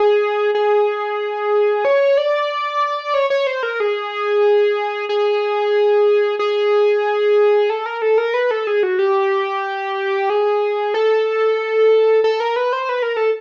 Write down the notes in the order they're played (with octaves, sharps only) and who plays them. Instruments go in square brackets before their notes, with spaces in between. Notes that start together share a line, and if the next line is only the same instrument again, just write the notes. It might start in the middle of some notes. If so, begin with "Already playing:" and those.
Already playing: [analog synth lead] G#4
G#4
C#5
D5
C#5
C#5
C5
A#4
G#4
G#4
G#4
A4
A#4
A4
A#4
B4
A4
G#4
F#4
G4
G#4
A4
A4
A#4
B4
C5
B4
A#4
A4